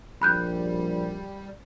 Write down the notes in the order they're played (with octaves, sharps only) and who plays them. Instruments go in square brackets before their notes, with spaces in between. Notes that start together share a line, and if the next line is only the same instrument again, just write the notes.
[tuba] A#1 [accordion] G3 [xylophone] B5 F#6 G6